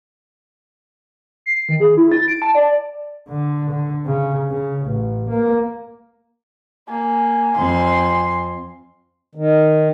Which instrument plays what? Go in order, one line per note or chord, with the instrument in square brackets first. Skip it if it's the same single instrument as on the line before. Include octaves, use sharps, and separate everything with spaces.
[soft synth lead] C7
D#3
G#4
E4
A6
D7
A5
D5
[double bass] D3
D3
C#3
C#3
A1
A#3
[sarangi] A#3 [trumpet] G#5
[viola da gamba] F2 [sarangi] C6
[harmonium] D#3